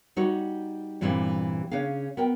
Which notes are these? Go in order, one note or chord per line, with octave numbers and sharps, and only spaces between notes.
G3 D#4 F#4 C#5
G2 A#2 E3 G3 C4 F4
C#3 C#4 D4 G#4 F5
B3 A#4 G5